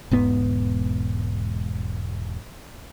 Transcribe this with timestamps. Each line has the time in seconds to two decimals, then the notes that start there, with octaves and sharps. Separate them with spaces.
0.11 E1 G#2 B3